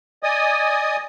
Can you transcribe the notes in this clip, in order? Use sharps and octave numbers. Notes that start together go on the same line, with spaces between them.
D5 D#5 G#5 D#6